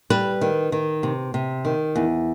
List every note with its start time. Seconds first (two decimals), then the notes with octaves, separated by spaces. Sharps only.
0.10 G3 B4
0.41 D#3
0.72 D#3
1.03 C3
1.34 C3
1.65 D#3
1.96 E2